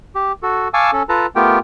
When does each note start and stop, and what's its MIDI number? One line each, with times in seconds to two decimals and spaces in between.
0.15 0.32 67
0.43 0.68 66
0.43 0.68 69
0.74 0.91 77
0.74 0.91 80
0.74 0.91 81
0.74 0.91 85
0.74 0.91 86
0.74 0.91 88
0.93 1.03 61
0.93 1.03 69
1.09 1.26 65
1.09 1.26 69
1.09 1.26 71
1.09 1.26 81
1.09 1.26 82
1.36 1.59 57
1.36 1.59 59
1.36 1.59 65
1.36 1.59 67
1.36 1.59 70
1.36 1.59 79